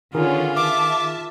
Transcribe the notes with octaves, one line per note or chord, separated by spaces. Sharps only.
D3 D#3 B3 C#4 F4 G#4 A#4
E5 A5 D6